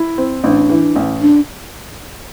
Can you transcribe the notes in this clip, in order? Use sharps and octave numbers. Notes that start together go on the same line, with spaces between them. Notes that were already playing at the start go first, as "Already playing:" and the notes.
Already playing: E4
C4
A1 D4
E3
A1
D4